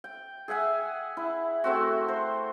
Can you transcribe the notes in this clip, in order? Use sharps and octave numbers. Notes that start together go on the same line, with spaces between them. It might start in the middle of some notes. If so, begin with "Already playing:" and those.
G5
G#4 E5 F#5 G#5
E4
A3 C4 F#4
C5